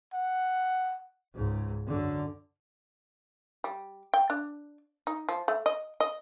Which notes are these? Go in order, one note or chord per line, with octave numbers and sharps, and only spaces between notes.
F#5
C#2 G#2
F#2 D3
G3
G5
D4
D#4
F3
A3
D#5
D#5